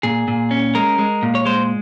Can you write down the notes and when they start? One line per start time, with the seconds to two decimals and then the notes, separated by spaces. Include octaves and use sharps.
0.03 A#2 G#4
0.28 A#2
0.51 C#4
0.75 G#3 A#4
0.99 G#3
1.23 A#2
1.35 C#5
1.45 G#3 C5